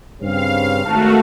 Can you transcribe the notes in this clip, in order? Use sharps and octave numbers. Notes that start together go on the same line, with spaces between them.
G2 C#3 C4 F5
G#1 A3 F#4 A#4 A5